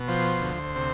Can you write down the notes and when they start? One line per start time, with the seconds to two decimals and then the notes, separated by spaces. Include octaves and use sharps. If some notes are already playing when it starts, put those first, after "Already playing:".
Already playing: B2
0.08 F3 C5
0.42 D2
0.76 C3